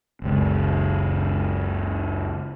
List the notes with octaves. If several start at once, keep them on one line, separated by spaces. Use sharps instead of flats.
F#1 C#2